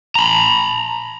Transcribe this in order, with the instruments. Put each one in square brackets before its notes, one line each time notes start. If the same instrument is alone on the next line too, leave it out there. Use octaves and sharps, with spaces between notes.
[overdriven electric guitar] A#5 B5